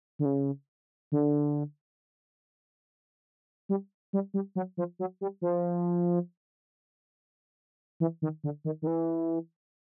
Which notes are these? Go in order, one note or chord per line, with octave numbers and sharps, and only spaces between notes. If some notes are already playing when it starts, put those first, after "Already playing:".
D3
C#3
D3
G3
G3
G3
F#3
F3
F#3
G3
F3
E3
D#3
D3
D#3
D#3
E3